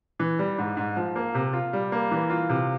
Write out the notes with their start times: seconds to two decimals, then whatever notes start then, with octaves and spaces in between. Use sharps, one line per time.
0.19 E3
0.39 G3
0.58 G#2
0.77 G#2
0.96 F3
1.16 A#3
1.35 C3
1.53 F4
1.73 G3
1.92 A#3
2.11 E3
2.30 F4
2.49 C3